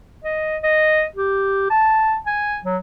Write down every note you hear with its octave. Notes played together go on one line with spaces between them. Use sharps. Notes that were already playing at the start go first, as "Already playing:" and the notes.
D#5
D#5
G4
A5
G#5
F#3